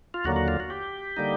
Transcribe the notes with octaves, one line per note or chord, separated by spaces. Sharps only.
F4
D#2 D3 F#3 A#3 F#4
F#4
F4
F#4
G4
D3 G3 A#3 D#4